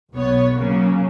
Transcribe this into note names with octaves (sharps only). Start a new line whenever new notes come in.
B1 B3 C#5
C#3 F#3 A#3